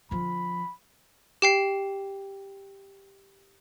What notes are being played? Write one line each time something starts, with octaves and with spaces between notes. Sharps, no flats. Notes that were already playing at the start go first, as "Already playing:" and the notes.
D3 F3 B5
G4 G5 C7